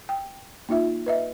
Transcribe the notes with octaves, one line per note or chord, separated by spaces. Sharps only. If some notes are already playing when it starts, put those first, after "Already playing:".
G5
A#3 D#4 F4 E5
B4 D#5 E5